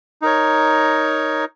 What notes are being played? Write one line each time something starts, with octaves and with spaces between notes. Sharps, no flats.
D#4 A#4 C#5